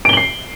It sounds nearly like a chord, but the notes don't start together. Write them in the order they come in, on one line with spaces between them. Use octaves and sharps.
D7 G7 F#7 C7